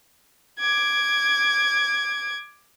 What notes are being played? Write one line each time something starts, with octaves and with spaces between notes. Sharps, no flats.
D6 G#6